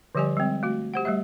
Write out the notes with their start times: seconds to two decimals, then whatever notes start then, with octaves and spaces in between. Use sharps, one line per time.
0.15 D3 F3 G3 G4 D5 G#5
0.37 G3 G#3 C4
0.63 A3 F#4
0.94 G4 C5 F#5
1.05 G3 A3 G4 E5